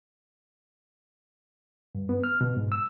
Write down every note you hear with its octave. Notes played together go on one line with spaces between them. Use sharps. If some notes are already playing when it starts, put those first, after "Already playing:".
G2
B3
F6
B2
G#2
E6